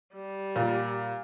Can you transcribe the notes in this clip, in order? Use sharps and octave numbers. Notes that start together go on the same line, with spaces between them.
G3
A#2